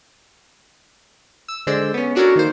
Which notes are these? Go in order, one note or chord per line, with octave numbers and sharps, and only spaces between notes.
E6
D3 G#3 C5 D5 E6
B3 C#4
C#4 D4 F#4 A4 A#4 C#5
D#3 A#3 C5